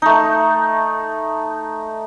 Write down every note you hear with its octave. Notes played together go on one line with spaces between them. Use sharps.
A3 D#4